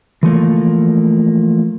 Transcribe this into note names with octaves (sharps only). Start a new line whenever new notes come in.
E3 F3 A3 A#3